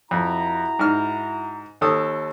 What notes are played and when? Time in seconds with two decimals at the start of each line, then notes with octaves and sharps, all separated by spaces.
0.11 F2 E4 F#4 A#5
0.79 G#2 F6
1.81 D#2 A4 D#6